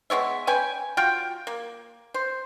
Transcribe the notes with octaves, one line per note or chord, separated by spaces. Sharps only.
G#3 B3 C#5 E5
C#4 B4 G5 G#5
F#3 F4 F5 G5
A#3
C5